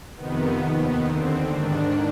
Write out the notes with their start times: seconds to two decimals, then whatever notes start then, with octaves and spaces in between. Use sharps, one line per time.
0.16 F2 C3 D#3 B3
0.60 D#2 D#3 B3
1.04 D#2 D3 C4
1.48 G#2 D#3 D4